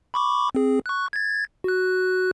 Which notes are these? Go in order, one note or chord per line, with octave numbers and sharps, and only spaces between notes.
B5 C#6 D6
C4 G#4
C#6 F#6
G#6 A6
F#4 F#6